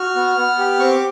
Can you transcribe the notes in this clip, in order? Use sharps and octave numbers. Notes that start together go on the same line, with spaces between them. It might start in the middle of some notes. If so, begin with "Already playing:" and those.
Already playing: F#4 F6
B3
B3
G4
C4 C#6
D6